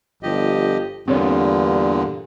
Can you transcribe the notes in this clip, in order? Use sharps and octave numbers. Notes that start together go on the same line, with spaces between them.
G1 F3 G4 D#5
E2 G2 A#2 D3 C4 C#5